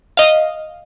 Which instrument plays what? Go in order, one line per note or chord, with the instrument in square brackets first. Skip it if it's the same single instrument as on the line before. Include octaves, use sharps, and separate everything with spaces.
[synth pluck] D#5 F5